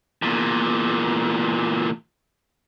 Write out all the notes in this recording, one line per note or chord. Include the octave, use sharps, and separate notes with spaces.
E2 A#2